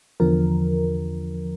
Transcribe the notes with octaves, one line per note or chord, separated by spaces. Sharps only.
E2 D3 F3 A#4